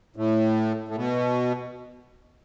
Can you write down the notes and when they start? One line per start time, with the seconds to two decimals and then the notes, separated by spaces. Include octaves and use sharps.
0.16 A2
0.88 A2
0.96 B2